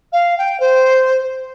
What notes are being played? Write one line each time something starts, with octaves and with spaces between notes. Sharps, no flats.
F5
G5
C5